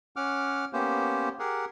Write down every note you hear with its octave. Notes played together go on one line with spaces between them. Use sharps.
C#4 F#5 D6 F6
A#3 B3 C#4 G4 C5
G4 G#4 A#4 F#5